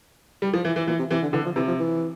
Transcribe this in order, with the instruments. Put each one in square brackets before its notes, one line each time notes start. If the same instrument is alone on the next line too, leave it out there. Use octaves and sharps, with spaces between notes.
[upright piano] G3
F3
E3
E3
[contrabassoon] A#2 [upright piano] E3
[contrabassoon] C3
[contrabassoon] C3 [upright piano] E3
[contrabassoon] D3
[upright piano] D3 [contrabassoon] E3
[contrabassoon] F3
[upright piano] C3 [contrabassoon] E3
[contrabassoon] F3
E3